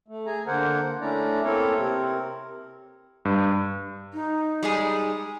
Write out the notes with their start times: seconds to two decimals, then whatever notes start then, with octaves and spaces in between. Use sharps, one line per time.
0.08 A3
0.26 G#4 G#5 A#5
0.47 D3 A#3 A#4 C5 F#5
1.01 A3 C#4 D4 E4 D5 A#5
1.44 A#3 C4 E4 A4 A#4 C#5
1.77 C3 C4 A#4
3.25 G2
4.14 D#4
4.63 G3 G#3 G#4